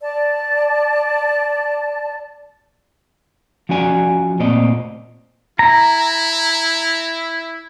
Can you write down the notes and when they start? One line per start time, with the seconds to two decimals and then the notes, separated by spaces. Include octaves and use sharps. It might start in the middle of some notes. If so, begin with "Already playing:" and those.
0.02 D5 A5
3.69 F3 C#4 F#4 D5 G#5
4.40 A#2 A3 C4 D5 D#5
5.59 E4 A#5